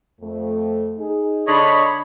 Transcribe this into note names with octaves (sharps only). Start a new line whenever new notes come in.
F2 A3
D#4 G#4
D3 D4 C#5 D#5 B5